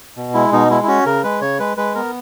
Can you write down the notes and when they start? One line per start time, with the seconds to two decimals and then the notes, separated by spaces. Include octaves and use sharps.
0.17 B2
0.34 G#3 E4
0.52 B2 D#4
0.70 G#3 E4
0.83 E4
0.88 C#4 F#4
1.06 C#3 A#4
1.24 G#3 B4
1.42 C#3 C#5
1.59 G#3 B4
1.77 G#3 B4
1.95 B3 A#4